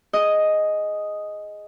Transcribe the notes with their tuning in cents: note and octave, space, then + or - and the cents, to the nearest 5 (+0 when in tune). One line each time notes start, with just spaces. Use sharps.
G#4 +0 D#5 +0